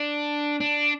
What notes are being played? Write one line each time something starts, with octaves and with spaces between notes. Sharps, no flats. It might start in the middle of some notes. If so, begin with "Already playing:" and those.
Already playing: D4
D4